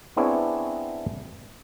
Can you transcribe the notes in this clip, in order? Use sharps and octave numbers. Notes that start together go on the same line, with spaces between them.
B3 C4 D4 E4 G#4 C#5